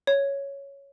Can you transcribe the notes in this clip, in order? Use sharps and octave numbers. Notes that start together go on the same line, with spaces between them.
C#5